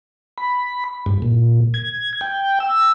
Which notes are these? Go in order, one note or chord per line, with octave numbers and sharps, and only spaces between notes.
B5
G2
A#2
G#6
G5
E6